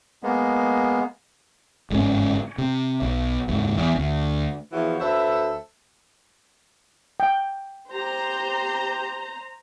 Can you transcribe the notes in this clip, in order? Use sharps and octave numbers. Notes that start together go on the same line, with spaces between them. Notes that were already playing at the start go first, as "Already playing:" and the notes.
G#3 A#3 B3
G1 G#2 B2 C#4
C3
B1
F#1 D#2 G#2
E2
D2
E2 E3 F3 F#4 C#5
D2 A4 B4 C5 E5
G5
G4 C5 A#5